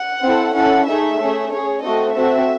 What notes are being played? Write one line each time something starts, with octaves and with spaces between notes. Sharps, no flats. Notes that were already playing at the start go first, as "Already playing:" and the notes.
Already playing: F#5
C4 E4 A4
C#4 E4 A4 F#5
A3 D#4 G#4 E5
A3 C#4 G#4
C#4 G#4 C#5
A3 C4 F#4 A4 D#5
C4 F#4 A4 E5